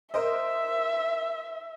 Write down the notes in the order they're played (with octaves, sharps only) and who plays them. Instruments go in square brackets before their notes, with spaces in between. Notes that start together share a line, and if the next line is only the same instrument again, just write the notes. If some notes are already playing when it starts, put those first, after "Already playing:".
[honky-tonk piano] A#4 C5 D#5 [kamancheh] E5